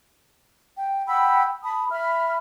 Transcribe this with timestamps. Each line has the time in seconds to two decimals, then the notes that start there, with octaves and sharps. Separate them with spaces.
0.77 G5
1.07 F#5 G5 B5 E6
1.63 A5 B5 D#6
1.91 E5 B5 F6